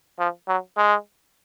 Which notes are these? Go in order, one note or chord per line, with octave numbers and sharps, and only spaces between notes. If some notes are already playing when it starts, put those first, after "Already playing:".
F3
F#3
G#3